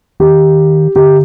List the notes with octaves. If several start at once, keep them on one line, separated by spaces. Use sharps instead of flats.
D#3 G4
D3 G4